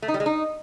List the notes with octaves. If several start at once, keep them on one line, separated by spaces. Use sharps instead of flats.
A3
D#4
G3
G#3
D#4